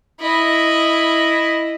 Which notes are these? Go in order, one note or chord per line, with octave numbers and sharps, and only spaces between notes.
E4 D#5